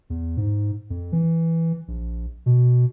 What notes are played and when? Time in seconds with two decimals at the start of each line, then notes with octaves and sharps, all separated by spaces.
0.10 E2
0.37 G#2
0.90 F2
1.12 E3
1.88 A#1
2.46 B2